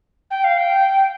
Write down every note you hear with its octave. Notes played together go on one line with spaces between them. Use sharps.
G5
F5
G5